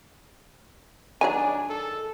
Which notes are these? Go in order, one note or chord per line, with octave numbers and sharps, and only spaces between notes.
D#3 F#3 D4 G#4 G#5
A4